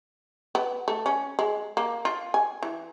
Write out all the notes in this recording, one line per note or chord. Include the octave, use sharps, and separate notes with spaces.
B3
A3
C#4
G#3
A#3
F4
G#5
E3